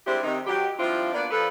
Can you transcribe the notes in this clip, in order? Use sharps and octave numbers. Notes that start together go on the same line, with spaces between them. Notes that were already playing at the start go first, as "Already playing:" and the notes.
G3 G#3 C4 D4 E4 G4
C3 D#3 D#4
F#3 G4
F3 G3 C4 D4 E4 F4
A#3 B3 D4 D5
F3 A4 B4